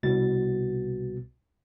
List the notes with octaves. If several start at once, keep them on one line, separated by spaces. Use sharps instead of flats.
C2 B2 A6